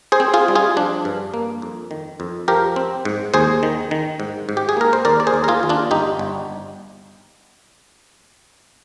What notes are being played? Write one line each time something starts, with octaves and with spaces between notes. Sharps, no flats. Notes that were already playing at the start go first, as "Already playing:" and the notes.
G#4 C5
C4
F4 G#4
G3
F4 G#4
F3 D4
G2
A#3
F2
D#3
F2
F3 G4 A#4
C4
G#2
D#2 G#4 C5
D#3
D#3
G#2
G#2
G4
G#4
A#3 A#4
C5
D#2 A#4 D5
D5
G#4 C5
D#2
A#4
F4 G#4
D#2
D4 F4
G1 D#4 G4
G1